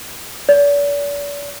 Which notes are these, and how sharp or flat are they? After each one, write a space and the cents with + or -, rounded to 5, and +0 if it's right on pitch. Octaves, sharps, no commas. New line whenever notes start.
D5 -40